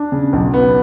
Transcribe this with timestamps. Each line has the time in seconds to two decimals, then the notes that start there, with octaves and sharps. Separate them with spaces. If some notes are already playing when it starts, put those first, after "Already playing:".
Already playing: D4
0.12 C#3
0.33 B1
0.54 B3